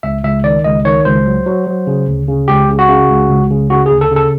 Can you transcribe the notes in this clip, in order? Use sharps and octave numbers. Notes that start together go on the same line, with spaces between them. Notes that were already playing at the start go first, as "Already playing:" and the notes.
C#2 E5
C#2 E5
D#3 D5
C#2 D#5
D#3 C#5
C#2 C5
F#3
F#3
F#3
C#3
D2
C#3
C#2 G4
C#3
F#4
C#3
C#2
C#2
C#3
C#3 F#4
D2 G#4
A4
C#3
A4